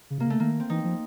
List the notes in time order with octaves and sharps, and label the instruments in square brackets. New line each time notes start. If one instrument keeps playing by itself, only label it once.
[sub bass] C#3
[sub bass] C3 [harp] A#3
[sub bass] C#3 [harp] A3
[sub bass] D#3 [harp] A#3
[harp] C4
[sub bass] E3 [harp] D#4
[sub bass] F3